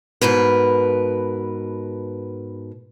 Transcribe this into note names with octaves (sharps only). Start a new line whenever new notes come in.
G#2 B2 A#4 B4